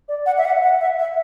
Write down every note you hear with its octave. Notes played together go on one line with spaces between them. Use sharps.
D5
F#5
E5
F#5
F#5
E5
E5